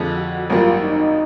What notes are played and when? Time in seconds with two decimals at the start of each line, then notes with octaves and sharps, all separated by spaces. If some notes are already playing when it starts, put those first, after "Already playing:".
Already playing: F2 D3 F3 G#3
0.16 F#4
0.49 G#1 F#2 D#3 G3 A#3 F4
0.83 D#4